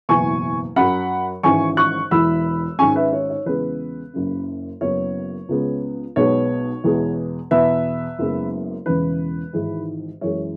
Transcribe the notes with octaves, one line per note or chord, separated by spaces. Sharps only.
F#1 E2 B2 G#5 C#6
F#2 F#3 C#4 F#5 B5
G#1 G#2 E3 C#4 G#5 C#6
C#6 F#6
E1 E2 E3 B5 E6
G#1 G#2 G#3 C#4 G#5 C#6
B4 E5
C#5
C#5
E2 C#3 G#3 B3 B4
F#1 F#2 C#3
F#1 F#2 F#3 B3 C#5
C#2 C#3 G#3 B3
B1 B2 G#3 B3 C#5
E2 B2 G#3 B3
E2 B2 B3 B4 E5
F#1 F#2 C#3 G#3 B3
E1 E2 C#3 E3 B4
G#1 G#2 E3 G#3
F#2 E3 G#3 C#5